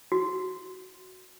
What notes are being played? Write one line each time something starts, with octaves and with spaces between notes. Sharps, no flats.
F#4